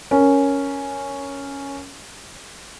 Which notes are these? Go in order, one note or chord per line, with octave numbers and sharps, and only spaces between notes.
C#4 A#4